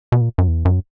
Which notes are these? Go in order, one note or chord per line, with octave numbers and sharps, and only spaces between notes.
B2
A#2
F#2
E2
F#2